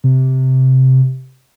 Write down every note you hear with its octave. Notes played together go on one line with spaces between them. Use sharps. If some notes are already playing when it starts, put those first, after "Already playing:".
C3